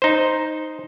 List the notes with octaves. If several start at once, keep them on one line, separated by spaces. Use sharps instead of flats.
D#4 C5